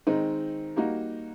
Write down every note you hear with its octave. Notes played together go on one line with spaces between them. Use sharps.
D#3 G#3 C4 D#4
G3 A#3 D#4 F#4